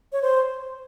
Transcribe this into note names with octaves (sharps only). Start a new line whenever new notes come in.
C#5
C5